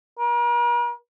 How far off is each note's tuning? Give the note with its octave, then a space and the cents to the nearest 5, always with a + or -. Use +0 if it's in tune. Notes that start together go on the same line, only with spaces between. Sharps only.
A#4 +45